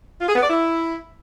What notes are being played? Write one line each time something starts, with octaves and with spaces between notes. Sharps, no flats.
F4
G#4
B3
D5
E4